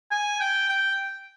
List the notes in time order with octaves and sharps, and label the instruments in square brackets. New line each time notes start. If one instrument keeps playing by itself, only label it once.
[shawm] G#5
G5
G5